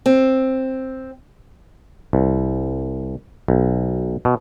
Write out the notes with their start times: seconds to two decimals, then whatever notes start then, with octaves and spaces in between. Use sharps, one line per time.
0.06 C4
2.13 C2
3.48 B1
4.25 B2